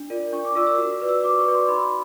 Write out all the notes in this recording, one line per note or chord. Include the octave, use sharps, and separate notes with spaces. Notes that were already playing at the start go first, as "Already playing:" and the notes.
Already playing: D4
F4 A#4 D5
D4 C#6
D6
F4 A#4 D5 E6
E6
F#4 E6
B4 D5
E6
F#4 D6
C#6
B4 D5
C6
D#4 B5